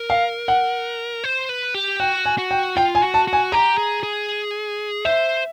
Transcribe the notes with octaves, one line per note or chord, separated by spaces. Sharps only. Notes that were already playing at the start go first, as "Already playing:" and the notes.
Already playing: A#4
F5
F#5
C5
B4
G4
F#4 G5
G#5
F#4
G5
F4 G5
G#5
F#4
A5
F#4
G#5
G4 A#5
G#4
G#4
C5 E5